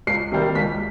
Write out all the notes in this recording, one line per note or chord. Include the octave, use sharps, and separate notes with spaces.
C#2 C7
C3 D#3 G3 A#3
C#2 B6